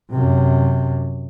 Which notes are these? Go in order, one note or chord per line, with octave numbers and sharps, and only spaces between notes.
F#2 C3